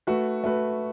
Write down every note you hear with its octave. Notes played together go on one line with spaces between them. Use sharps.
A3 F#4 B4
A3 F#4 B4